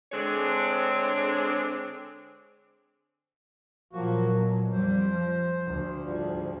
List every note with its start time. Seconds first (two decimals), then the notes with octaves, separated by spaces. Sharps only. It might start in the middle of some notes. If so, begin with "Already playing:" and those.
0.12 D3 G#3 C4 D4 G#4 C#5
3.93 A#2 F3 F#3 A#3 F#4
4.34 B2
4.72 F2 G3 C5
5.13 F3
5.66 D2
6.03 G#2 F3 G3